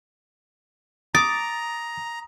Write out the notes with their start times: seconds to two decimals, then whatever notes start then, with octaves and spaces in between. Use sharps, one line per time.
1.15 A#5 D6 D#6 A6